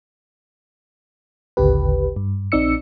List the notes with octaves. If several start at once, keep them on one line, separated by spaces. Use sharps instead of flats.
G#1 D2 C#3 G4 B4
G2
A#1 C4 D#4 D5 E6 C#7